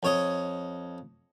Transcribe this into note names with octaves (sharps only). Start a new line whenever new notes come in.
F2 C#5 D#5